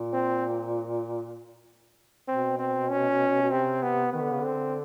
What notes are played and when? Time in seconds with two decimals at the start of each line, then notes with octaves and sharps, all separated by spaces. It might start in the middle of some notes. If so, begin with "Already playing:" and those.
Already playing: A#2
0.13 C4
2.28 B2 C4
2.59 C4
2.90 C#4
3.42 B2
3.51 C3 C4
3.83 B3
4.13 D#3 B3
4.22 D3
4.31 C#3
4.40 D3 C4